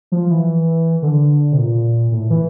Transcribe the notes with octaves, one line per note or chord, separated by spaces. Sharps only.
F3
E3
D3
C3
A#2
A2
E3